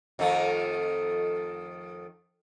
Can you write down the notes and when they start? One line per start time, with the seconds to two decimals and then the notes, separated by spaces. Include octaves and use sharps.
0.19 F2 D#3 A3